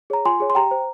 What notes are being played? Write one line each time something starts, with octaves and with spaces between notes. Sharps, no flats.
G#4 C#5 A#5
F4 G#5 C6
G#4 C#5
C6
G4 G5 A#5
C5